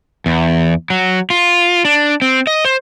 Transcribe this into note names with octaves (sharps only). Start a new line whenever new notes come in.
E2
F#3
F4
D4
C4
D#5
C5